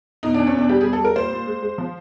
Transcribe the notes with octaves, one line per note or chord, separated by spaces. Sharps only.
B2 D#4
E2 D4
C#4
B2 D4
G3 G4
G3 G#4
A4
G3 A#4
A#2 C5
A#2
G#3
G#3
F3